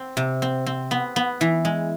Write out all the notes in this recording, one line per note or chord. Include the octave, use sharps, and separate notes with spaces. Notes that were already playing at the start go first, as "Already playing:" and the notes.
Already playing: C4
C3
C4
C4
B3
B3
E3
G#3